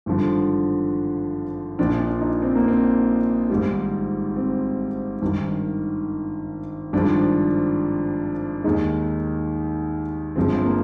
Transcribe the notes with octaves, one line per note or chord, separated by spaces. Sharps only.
G#1 G2 D3 F3
A#1 A#2 F3 D4
D4
D#4
C4
A#3
C4
G#1 G#2 G3
C4
G#1 G2 D#3
G#1 G2 F3 G#3 D4
D#2 D#3 G#3 D#4
G1 G2 F3 G#3 C4
A#3